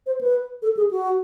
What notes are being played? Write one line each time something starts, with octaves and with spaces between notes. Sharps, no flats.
C5
B4
A4
G#4
F#4